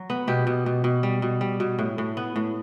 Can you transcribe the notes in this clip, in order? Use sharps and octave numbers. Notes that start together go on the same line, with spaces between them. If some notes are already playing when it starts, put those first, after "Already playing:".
Already playing: F#3
B3
B2 G4
B2
B2
B2
G3
B2
G3
B2
A2
A2
B3
A2